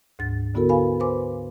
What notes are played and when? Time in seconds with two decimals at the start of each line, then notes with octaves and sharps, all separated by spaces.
0.19 D2 G#2 A6
0.54 D3 B3 E4 F#4 A4 A#4
0.69 B4 F5 G#5 B5
1.00 B4 C5 G#5 C6 D6